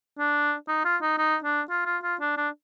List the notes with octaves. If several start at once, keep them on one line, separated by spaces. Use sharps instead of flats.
D4
D#4
F4
D#4
D#4
D4
F4
F4
F4
D4
D4